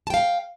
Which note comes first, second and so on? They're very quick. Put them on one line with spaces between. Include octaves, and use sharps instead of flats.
A5 G5 F5